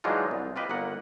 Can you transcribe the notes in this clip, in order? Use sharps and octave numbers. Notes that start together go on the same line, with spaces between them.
E3 F#3 G#3 D4 D#4 F4
C2
F4 G4 B4 D#5
G1 A#3 F#5